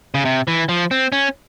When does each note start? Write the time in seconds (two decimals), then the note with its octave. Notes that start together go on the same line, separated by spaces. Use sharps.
0.14 C#3
0.25 C3
0.48 E3
0.69 F3
0.91 C4
1.12 C#4